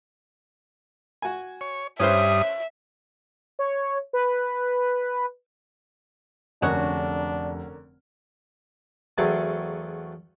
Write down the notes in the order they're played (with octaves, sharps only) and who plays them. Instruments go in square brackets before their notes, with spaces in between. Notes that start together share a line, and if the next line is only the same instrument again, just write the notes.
[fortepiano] F#4 G#5
[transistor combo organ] C#5
[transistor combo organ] G2 D#6 [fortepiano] C#4 B4 C5 [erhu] E5
[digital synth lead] C#5
B4
[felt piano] F1 [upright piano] D3 C#4 A#4 [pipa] G#3 F#4 [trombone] D4
[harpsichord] E2 C#3 F#3 A3 C4 G#4